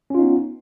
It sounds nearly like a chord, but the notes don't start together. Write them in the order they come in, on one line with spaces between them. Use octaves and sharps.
C#4 F4 D#4 B3